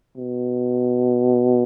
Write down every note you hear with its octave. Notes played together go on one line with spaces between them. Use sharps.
B2